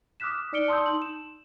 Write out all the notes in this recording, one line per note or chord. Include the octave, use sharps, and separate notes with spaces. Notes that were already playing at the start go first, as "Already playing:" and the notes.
D6 D#6 F6 F#6 B6 E7
D#4 D5 F6 C#7 D7 G7
A5 C6 D#6 E6 G6
D#4 F#7
E7